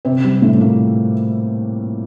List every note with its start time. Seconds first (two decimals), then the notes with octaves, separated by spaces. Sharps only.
0.05 C3 C4
0.24 G3
0.42 A2 A3
0.61 A#2 A#3